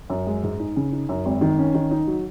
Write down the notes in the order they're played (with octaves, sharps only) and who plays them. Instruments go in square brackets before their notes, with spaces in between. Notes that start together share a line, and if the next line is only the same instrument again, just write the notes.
[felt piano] F#2
G#3
G#2
D#4
C#3
D#4
F#2
G#1
D#3
C#4
D#3
D#4
F#3